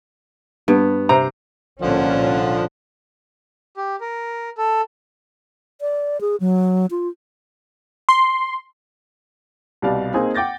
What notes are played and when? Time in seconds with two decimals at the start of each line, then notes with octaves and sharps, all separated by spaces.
0.68 G2 B3
1.09 C3 C5 A#5
1.82 C2 A#2 D3 F3 C#4
3.77 G4
4.01 A#4
4.58 A4
5.81 D5
6.21 G#4
6.40 F#3
6.91 F4
8.09 C6
9.82 C2 B2 G3 D5 F5
10.14 A#3 C4 D#4 G#4 C5
10.35 F#5 G5 D6 G6 A6 A#6